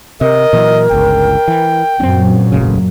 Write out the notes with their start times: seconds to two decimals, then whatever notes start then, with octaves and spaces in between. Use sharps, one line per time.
0.21 C3 A#4 D#5
0.53 A#2 E3 F#3
0.91 G1 C#2 G5
1.48 E3
2.00 F#2 A#2 C4 C#4
2.52 E1 A1 C#3